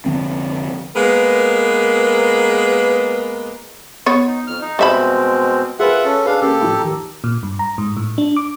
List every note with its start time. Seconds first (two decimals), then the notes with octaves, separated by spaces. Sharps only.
0.06 F1 D3 F3 C4
0.95 G#3 A#3 B3 A#4 B4
4.06 B3 C#5
4.27 D#4
4.47 F2 F6
4.61 D#4
4.79 B2 G3 G#3 C4 E5 B5
5.79 F4 G#4 A#4 B4 E5 F#5
6.04 C#4 A4
6.26 D4 G#4 B4 F5
6.41 C#3 A#3 G4 A4
6.61 A2 F3
6.79 D#2 A#5
7.24 A#2
7.43 G2
7.59 A#5
7.78 G#2
7.97 A2
8.18 D4
8.36 D6